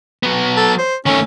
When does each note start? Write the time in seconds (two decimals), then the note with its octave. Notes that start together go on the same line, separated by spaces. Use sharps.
0.23 F#3 B3
0.57 A4
0.78 C5
1.06 D#3 A3 C#4